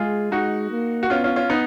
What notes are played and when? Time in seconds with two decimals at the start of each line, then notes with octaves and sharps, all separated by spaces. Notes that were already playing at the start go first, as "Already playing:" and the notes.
Already playing: G#3 F4 G#4
0.32 G#3 D#4 F#4
0.71 A#3
1.03 F#4
1.10 B3 C#4 F4
1.24 C#4 F4
1.36 C#4 F4
1.50 B3 D#4